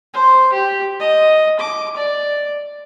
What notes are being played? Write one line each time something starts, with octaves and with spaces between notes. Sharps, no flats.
C5
G4
D#5
D6
D5